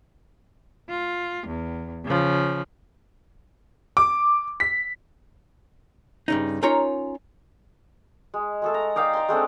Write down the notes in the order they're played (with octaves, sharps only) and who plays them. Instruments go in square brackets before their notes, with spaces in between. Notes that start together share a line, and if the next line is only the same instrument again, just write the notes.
[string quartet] F4
E2
C#3 F3
[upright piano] D6
B6
[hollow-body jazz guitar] G2 C#3 D#4
C#4 D#4 F4 A#4 C#5 A#5
[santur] G#3
G#3 A3 A4
A#5
D#4 D5 F5 G5
A#5 C6
G#3 A3 C4 D4